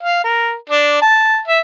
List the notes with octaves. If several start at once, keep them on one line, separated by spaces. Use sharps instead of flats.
F5
A#4
D4
A5
E5